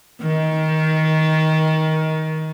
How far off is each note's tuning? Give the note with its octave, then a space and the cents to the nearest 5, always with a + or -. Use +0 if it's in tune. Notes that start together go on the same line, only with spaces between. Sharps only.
D#3 +20